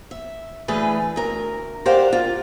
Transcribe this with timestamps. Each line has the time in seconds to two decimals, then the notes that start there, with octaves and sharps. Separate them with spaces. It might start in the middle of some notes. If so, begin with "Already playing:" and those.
0.11 E5
0.68 D3 E3 A3 G#4 B4
1.16 D2 A#4
1.85 G4 A#4 C5 D5 F5 F#5
2.13 F4